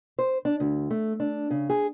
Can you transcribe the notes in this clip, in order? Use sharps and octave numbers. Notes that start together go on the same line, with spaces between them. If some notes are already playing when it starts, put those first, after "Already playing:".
C5
D4
D2
A3
D4
C#3
G#4